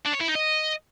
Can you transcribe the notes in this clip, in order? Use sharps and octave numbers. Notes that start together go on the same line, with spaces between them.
D4
C#5
E4
D#4
D#5